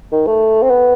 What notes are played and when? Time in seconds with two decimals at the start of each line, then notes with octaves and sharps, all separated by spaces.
0.12 D#3
0.27 A3
0.62 C4
0.70 B3